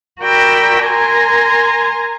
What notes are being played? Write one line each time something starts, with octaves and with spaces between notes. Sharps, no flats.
F#4 A#4 D5 G5 B5 E6
A#4 G#5 A#5 C6